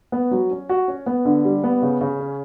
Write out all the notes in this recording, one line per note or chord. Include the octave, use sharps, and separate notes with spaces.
B3
F#3
C#4
F#4
C#4
B3
D3
G3
B3
C#3
C#3
C#4